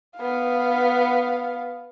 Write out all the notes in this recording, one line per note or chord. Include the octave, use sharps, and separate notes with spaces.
B3 F5